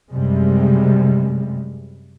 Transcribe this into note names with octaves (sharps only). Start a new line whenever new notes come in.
F#2 C3 G3 G#3